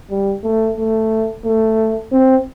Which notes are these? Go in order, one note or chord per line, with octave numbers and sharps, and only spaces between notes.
G3
A3
A3
A3
C4